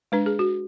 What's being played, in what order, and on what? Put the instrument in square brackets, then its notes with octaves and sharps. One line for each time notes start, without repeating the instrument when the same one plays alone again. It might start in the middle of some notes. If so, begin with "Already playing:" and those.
[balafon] G#3 D4 B4
G#4
F#4